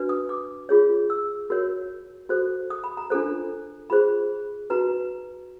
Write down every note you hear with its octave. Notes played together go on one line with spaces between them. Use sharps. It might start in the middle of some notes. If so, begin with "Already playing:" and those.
Already playing: D4 F#4 B4
D#6
D6
F4 G#4 C#5
E6
F#4 A#4 C#5
F#4 A4 C5
D#6
B5
A#5
D4 F4 A4 C5
F4 G#4 C5 B5
D#4 F#4 B4 A#5